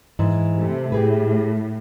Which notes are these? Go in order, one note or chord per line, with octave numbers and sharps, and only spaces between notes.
G#2 E3
C3 A3
A2 G4 G#4 B4